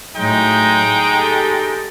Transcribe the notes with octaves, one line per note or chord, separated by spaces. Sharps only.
A2 F#3 G#3 D#4 G5
G4 A4